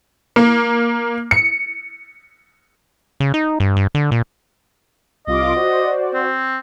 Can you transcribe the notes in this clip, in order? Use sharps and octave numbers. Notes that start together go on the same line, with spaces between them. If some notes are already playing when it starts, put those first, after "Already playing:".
A#3
C#7
C#3
D#4
G2
G2
D3
A#2
C2 F4 D#5 D6
F#4 C5 D5
C4